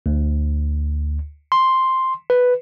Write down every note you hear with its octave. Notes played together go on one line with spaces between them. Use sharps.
D2
C6
B4